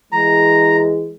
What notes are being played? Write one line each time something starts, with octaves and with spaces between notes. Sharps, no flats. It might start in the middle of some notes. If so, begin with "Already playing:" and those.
E3 G#3 A#5